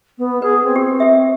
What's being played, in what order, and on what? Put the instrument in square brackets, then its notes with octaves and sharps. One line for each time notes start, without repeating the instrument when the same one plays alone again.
[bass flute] B3
[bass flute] G#4 [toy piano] B4
[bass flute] C4
[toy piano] G4
G4 E5